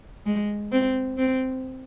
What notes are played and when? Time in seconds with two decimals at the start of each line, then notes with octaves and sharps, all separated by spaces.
0.26 G#3
0.72 C4
1.18 C4